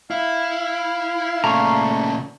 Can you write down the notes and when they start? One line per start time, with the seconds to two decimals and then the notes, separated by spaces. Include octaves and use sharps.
0.11 E4 F5
1.44 A#2 C#3 A3 A#5 C#6